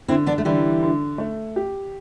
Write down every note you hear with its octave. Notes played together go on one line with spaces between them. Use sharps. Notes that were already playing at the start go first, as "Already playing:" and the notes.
D3 C4 E4
B3 D4
A3
D3 E3 G3
D3
A3
G4